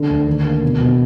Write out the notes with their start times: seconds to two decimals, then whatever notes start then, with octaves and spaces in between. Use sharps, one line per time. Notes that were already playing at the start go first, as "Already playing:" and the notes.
Already playing: D3
0.08 D2
0.27 D#3
0.45 A#3
0.62 B2
0.80 B2